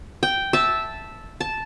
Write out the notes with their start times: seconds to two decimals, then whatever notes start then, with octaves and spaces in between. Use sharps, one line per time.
0.23 G5
0.53 E5 A5
1.41 A5